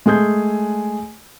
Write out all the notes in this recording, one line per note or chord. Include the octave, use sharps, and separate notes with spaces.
G#3 A3 G#4 G6